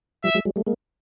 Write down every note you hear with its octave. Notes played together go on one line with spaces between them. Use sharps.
F3 G3 E5
F#3 G#3
F#3 G#3
G3 A3
G#3 A#3